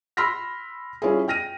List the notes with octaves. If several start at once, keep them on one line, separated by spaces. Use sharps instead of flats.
B5 C6 E6 F6 A#6 B6
G3 C#4 E4 F4 G#4
G5 F6 A#6 D#7